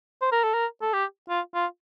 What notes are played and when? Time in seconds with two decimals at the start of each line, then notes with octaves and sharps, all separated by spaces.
0.22 C5
0.32 A#4
0.44 A4
0.54 A#4
0.82 A4
0.94 G4
1.29 F4
1.55 F4